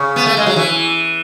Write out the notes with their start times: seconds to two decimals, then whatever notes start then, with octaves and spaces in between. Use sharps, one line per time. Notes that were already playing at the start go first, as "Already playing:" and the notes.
Already playing: C#3
0.16 B3
0.26 A3
0.37 G#3
0.46 F#3
0.56 E3